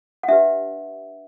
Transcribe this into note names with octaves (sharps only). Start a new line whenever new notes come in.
F#5
D4 G4 B4 E5